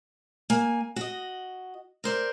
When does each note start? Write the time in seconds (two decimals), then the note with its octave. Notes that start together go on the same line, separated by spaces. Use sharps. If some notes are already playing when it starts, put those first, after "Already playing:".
0.50 A#3 G#5
0.96 F#4 D#5
2.04 A#4 C5 D5